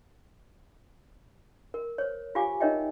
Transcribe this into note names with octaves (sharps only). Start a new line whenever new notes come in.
A#4
C5 C#5
F4 G4 F5 F#5 G#5 D6
D#4 A#4 C#5 D#5 E5 G5